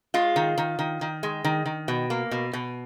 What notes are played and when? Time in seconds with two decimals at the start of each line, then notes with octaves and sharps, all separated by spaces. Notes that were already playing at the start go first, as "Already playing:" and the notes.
0.14 G#3 F4
0.36 D#3
0.58 D#3
0.79 D#3
1.01 D#3
1.23 G#3
1.44 D#3
1.66 D#3
1.88 B2
2.10 A#3
2.31 B2
2.53 B2